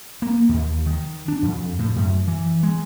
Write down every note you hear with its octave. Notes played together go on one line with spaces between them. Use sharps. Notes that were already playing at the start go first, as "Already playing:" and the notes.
A#3
D#2
D#3
D4
F2
A2
F#2
E3
G#3